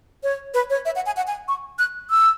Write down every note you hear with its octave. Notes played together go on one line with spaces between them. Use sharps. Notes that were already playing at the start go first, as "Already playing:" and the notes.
C#5
B4
C#5
E5
F#5
G#5
F#5
G#5
C#6
F#6
E6